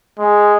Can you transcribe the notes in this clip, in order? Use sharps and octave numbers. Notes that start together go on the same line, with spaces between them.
G#3